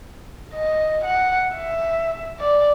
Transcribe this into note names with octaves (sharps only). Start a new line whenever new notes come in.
D#5
F#5
E5
D5